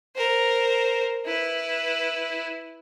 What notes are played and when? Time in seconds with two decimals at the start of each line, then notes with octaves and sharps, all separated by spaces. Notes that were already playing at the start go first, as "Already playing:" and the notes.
0.16 A#4 C5
1.25 E4 B4